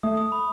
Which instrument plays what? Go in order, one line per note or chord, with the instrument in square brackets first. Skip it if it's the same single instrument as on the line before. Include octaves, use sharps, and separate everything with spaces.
[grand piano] A3 [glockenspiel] D#6
[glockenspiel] D#6
B5